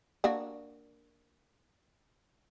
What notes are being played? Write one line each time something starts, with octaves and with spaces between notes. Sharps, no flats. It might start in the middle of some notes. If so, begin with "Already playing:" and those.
A#3 D4 F#4